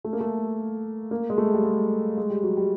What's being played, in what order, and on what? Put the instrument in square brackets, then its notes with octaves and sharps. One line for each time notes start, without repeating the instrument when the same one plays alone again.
[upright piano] A3
A#3
A3
A#3
G#3
A3
G3
G#3
G#3
G3
F#3
G3